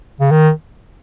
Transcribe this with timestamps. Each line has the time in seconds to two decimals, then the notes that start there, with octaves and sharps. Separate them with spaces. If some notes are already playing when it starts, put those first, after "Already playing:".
0.20 C#3
0.31 D#3